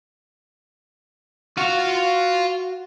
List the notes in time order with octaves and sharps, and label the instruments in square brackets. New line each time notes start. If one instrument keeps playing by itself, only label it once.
[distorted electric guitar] F4 F5 [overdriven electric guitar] F#4